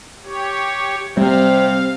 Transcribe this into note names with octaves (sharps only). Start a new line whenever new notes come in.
G4 C#5
C3 G3 C4 F5